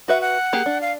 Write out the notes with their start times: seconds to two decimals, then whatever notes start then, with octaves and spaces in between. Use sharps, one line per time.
0.08 F#4 B4 E5 F#5
0.21 F#5
0.53 A#3 G4 G#4
0.66 D4
0.81 F5